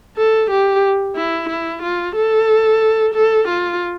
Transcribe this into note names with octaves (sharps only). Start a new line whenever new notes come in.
A4
G4
E4
E4
F4
A4
A4
F4